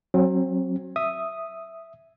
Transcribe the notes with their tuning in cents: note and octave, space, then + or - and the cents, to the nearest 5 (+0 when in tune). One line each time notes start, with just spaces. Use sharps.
F#3 +0 C4 +35
E5 +0 D#6 +0